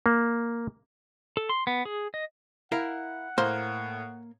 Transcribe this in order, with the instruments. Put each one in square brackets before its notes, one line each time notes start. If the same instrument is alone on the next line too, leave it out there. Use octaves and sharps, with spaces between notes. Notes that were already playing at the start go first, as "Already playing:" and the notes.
[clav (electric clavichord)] A#3
[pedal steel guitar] A4
C6
B3
G#4
D#5
[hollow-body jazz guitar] E4 A#4 F5 [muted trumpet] F#5
[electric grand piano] A2 [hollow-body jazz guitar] A#3 [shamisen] C5